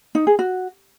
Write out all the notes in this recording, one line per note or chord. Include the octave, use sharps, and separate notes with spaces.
D#4
G#4
F#4